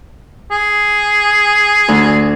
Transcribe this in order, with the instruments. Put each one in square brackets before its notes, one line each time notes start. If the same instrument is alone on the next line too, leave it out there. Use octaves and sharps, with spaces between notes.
[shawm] G#4
[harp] D2